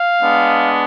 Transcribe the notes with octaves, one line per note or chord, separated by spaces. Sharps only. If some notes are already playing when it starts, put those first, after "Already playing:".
Already playing: F5
G#3 B3 D4